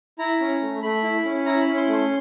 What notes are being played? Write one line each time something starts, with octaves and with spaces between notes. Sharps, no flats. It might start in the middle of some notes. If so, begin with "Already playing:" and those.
E4 A#5
C#4
A3
A3 B5
E4
C#4
E4 A#5
B5
C#4
C6
A3
C6